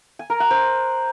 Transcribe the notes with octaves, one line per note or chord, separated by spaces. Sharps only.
G#5
A#4
F#5
C5